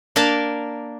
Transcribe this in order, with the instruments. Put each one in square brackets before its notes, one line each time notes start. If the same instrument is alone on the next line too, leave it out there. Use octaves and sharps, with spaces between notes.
[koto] A#3 D4 A#4 A5